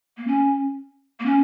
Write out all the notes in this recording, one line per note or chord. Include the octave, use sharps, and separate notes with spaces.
A#3
C#4
A#3
C#4